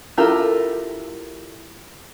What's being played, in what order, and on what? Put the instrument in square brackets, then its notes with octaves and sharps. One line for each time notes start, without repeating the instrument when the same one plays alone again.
[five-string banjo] E4 F4 G4 A4 A#4